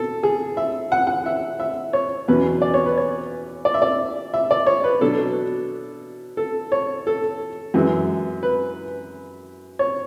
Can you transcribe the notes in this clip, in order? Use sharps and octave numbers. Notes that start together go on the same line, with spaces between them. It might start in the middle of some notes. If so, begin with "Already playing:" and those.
Already playing: B2 A4
G#4
E5
F#5
F#5
E5
E5
C#5
E2 B2 F#3 C#4 B4
D5
C#5
B4
C#5
D5
E5
D5
E5
D5
C#5
B4
B2 F#3 B3 D4 A4
A4
C#5
A4
F#2 E3 G#3
B4
C#5